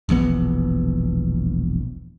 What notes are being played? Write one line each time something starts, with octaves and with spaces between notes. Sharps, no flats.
E1 A#1 E3 B3